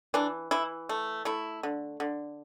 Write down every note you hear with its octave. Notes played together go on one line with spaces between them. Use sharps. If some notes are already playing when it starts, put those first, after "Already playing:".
E3 D4
E3 E4
A3
A3 E4
D3
D3